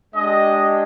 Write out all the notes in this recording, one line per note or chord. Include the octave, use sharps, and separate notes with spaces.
G#3 D4 G4 D#5